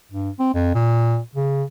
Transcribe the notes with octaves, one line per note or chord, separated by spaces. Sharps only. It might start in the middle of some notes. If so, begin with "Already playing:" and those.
G2
C4
F2
A#2
C#3